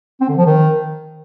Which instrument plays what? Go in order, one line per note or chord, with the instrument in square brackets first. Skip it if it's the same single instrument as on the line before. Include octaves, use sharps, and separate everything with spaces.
[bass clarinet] C4
D3
F3
D#3